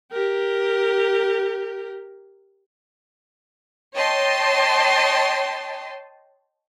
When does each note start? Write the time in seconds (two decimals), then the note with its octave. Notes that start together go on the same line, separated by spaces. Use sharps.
0.12 G4 A#4
3.95 C#5 D#5 G5 A5 C6